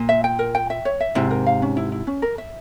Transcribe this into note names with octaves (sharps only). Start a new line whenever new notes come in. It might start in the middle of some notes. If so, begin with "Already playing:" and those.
Already playing: A#2
E5
G5
A#4
G5
E5
C#5
E5
G#2 C3 E4
A#4
F5
C#4
E4
E4
C#4
A#4
E5